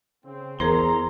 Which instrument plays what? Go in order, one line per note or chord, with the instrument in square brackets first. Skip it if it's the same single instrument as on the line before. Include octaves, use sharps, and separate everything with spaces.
[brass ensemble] C#3 C4
[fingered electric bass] E2 [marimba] G#4 A#4 C5 [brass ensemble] A#5 [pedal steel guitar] C6